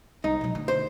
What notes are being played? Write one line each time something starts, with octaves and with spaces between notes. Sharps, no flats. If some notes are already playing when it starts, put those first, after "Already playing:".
C2 D#4
B2 F#3
D2 D3
C5